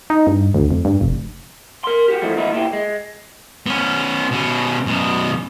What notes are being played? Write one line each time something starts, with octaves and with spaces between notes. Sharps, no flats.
D#4
G2
D2
F2
G2
F1
A#4 C6
F#4 G4
F2 G#2 E3 F3 A3
G#2 B2 E3 B3 D#4 E4
A#2 E4 G4
G#3
B3 C#4
B2 C#4
F#2 B2